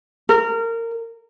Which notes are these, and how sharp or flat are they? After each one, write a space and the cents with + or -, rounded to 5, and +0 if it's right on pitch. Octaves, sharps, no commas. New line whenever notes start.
A#4 -25